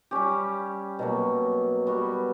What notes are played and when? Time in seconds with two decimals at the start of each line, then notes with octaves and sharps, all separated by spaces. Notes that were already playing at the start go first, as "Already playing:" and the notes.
0.11 G3 C#4 G4
0.99 B2 F#3 A#3
1.87 G3 B3 F#4